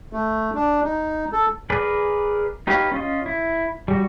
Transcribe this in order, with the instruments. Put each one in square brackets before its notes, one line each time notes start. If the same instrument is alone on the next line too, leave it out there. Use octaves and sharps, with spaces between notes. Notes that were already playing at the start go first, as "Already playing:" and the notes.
[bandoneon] A3
D4
D#4
A4
[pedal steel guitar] G#4 A#4 B4 D5
D#4 G4 B4 C#5 F5
C#4 F4 D#5
E4
G3 F#4